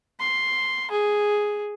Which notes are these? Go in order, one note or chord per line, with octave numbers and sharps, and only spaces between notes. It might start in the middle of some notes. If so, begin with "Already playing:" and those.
C6
G#4